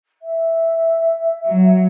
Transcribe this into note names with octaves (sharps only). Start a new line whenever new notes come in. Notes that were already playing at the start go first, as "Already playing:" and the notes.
E5
F#3